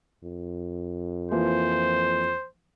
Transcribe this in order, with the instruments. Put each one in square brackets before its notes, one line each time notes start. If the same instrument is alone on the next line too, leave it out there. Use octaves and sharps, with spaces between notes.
[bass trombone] F2
[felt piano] E3 F3 A#3 [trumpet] C5